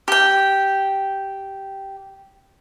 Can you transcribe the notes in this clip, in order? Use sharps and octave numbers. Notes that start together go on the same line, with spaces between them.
G4 G5